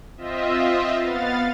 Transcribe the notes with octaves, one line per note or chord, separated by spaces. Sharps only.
C4 F4 D#5 E5
B3 F5 A6